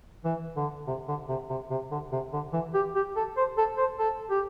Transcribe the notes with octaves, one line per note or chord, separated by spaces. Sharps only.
E3
D3
C3
D3
C3
C3
C3
D3
C3
D3
E3
G4
G4
A4
C5
A4
C5
A4
G4